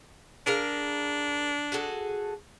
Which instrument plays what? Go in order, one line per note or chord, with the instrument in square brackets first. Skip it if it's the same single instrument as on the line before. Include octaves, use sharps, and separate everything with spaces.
[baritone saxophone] D4 [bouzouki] G#4 A#4 F5
[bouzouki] F#4 G#4 A4